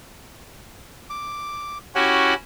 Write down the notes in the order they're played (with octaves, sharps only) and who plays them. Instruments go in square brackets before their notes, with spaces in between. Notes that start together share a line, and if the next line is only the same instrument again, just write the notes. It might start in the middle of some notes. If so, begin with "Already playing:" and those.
[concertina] D6
[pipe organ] C#4 E4 F#4 [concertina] G4 C#5 F#5